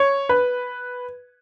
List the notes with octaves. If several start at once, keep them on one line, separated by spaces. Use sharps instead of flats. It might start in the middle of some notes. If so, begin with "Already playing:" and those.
Already playing: C#5
B4